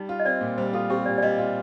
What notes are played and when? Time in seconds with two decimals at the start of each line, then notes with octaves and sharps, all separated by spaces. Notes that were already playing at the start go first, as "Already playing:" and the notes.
Already playing: G3 D#4
0.09 F4
0.20 D#5
0.25 C4 D5
0.41 A#2
0.58 G3 C5
0.73 F4 A4
0.90 C4 G4
1.06 A#2 D5
1.18 D5
1.22 G3 D#5
1.39 F4